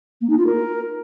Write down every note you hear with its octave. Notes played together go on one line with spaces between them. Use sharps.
A#3
D#4
F4
A#4